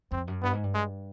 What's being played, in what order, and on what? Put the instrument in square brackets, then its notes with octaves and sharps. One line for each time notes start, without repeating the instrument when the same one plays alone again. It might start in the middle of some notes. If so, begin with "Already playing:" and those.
[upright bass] F2 [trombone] C4
[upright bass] F#2
[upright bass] G2 [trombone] B3
[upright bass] G#2
G2
[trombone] G#3